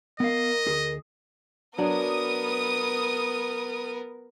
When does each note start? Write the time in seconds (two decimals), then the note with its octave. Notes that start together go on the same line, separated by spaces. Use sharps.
0.20 B3 A#4 D#5 F5
0.67 D2 G#4
1.78 F#3 B3 D4 A#4 D#6